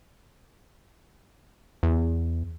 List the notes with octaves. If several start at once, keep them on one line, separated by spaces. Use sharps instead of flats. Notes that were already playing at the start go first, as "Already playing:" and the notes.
E2